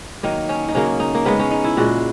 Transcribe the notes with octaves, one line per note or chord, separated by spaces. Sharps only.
D#3 F#3 A#3 D#4
C#4
D#4
C#3 F#3 A#3 C#4
D#4
A#3
C#3 G#3 B3
C#4
D#4
E4
A#2 G#3 F#4